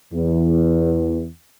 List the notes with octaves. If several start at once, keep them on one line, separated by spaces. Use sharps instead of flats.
E2